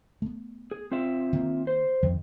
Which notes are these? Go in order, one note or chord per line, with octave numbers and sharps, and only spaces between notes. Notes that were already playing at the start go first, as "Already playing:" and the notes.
A3 B3
G#4
C4 F4 E5
D#3 A#3
C5
F2 D#3